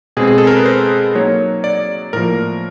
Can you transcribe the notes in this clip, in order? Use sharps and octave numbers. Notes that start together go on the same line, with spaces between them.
B2 G#3 C4 G#4
G#4
A4
A#4
B4
C5
F#3 A#3 D#4 C#5
D5
A2 F3 A#3 A#4